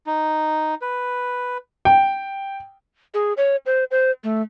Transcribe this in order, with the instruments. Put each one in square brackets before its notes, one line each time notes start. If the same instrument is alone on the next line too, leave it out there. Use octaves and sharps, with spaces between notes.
[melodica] D#4
B4
[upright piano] G5
[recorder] G#4
C#5
C5
C5
A3